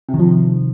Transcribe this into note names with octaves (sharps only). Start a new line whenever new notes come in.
C3
D#3
F3